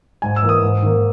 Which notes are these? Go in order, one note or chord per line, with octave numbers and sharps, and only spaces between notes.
G#2 G#5
E6
E3 A#3
D#6
G#2
D#3 A#3